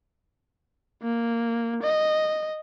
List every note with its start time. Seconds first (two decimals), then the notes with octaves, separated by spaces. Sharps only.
1.02 A#3
1.83 D#5